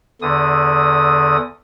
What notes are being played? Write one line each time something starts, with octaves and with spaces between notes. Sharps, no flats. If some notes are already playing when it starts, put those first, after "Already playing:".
E2 D3 D#6